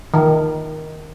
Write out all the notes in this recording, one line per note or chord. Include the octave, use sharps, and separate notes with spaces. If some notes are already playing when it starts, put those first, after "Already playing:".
D#3